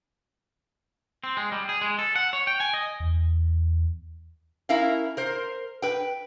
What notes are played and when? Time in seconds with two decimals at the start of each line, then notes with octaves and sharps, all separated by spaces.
1.24 C4
1.37 G#3
1.52 G3
1.69 G#4
1.81 G#3
1.99 A4
2.16 F#5
2.33 C#5
2.47 G5
2.60 G#5
2.74 D#5
3.00 E2
4.69 C#4 E4 A#4 E5 F5
5.17 A#4 C5
5.82 B4 G5